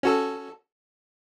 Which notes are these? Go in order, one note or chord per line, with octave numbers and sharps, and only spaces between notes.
C#4 F#4 A4